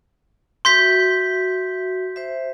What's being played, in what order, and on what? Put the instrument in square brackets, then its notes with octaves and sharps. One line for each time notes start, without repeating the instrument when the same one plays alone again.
[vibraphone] F#4 E5 [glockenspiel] C6 G6 B6
[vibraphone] C5 E5